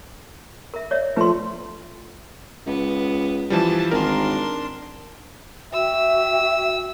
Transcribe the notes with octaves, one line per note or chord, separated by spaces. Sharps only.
A#4 E5
C#5 D5 E5
F3 A3 B4 C6
C#2 B3
E3 F3 G3 A5
G#1 D4 A#4 C6
F#4 E5 G5 E6